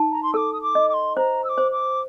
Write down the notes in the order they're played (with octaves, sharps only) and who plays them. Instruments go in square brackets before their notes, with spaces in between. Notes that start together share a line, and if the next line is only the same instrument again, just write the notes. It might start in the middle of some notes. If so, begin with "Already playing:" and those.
Already playing: [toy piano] D#4 A5
[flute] A#5
C6
[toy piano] A4 [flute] D6 E6
[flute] D#6
D6
[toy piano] D#5
[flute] D6
C6
[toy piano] C5 [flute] A#5
[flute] E6
D6
[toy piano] C5
[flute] D6